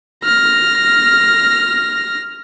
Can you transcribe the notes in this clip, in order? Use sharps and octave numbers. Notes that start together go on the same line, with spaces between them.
F6 A#6